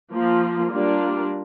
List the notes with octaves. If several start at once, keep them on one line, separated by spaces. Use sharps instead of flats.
F3 A#3 F4
G3 A#3 D4 F4